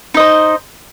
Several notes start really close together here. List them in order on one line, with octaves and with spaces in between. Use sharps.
D#4 D#5 C5